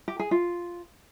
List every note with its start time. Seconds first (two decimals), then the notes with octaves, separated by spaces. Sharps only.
0.08 G4
0.20 G#4
0.31 F4